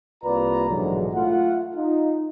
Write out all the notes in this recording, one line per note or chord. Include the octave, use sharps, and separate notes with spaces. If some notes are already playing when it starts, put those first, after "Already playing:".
C2 A#3 F4 B4 D5 A#5
A#1 G#2 B2 D3 E3 F#3
A3 F4 F#5
D#4 F4